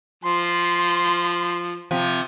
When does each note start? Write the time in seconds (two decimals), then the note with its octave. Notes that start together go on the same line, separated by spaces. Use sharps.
0.24 F3 C6
1.91 C3 F3